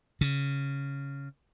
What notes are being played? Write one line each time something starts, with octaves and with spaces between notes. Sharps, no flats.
C#3